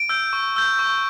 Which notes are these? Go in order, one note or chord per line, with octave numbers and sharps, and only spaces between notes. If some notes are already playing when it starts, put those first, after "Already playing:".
Already playing: D7
E6 G6
C#6
E6 G6
C#6